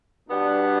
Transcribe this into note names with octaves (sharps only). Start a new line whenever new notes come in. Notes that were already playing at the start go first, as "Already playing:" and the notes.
B2 G3 B3 D4